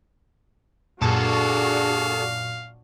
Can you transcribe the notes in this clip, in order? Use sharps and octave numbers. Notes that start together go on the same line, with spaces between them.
F#2 A#2 D4 F#4 G#4 A4 F5